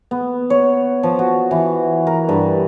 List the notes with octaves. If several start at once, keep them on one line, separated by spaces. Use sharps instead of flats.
B3
C#5
F3
F#4
E3
A#4
G2